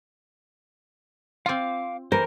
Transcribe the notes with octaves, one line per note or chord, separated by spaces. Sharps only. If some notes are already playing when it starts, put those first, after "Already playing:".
C4 F4 F5 D6
E3 A#4 C5